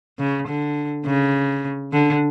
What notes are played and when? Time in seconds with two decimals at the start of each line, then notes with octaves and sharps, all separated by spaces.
0.19 C#3
0.47 D3
1.06 C#3
1.92 D3